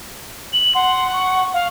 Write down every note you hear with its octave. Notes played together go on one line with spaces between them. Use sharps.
F#7
F#5 C6
C#6
F5